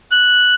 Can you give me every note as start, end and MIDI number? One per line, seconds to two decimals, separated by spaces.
0.12 0.55 90